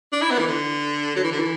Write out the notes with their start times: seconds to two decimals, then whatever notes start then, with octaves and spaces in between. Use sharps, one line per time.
0.13 D4
0.22 E4
0.31 B3
0.39 E3
0.47 D3
1.16 F#3
1.24 E3
1.32 D3
1.40 E3